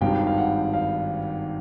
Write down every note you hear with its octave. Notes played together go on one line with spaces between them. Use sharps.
G#1 G2 D#3 G3 F5 G5
F5
F#5
F5